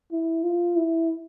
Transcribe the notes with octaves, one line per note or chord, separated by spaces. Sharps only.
E4
F4
E4